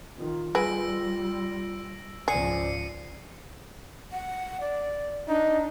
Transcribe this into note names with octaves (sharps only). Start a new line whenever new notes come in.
D#3 F4
G3 G#4 B4 E6 A#6 D7
C#2 G#2 F3 G#4 D5 C7 C#7 D#7
F#5
D5
D4 D#4